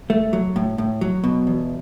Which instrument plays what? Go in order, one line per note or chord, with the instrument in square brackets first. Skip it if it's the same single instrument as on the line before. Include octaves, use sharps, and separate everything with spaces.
[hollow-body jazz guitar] A3
F#3
A2
A2
F#3
B2
E2